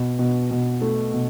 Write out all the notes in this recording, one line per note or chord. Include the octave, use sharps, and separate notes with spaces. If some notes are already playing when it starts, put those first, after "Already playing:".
Already playing: B2
B2
B2
A3
B2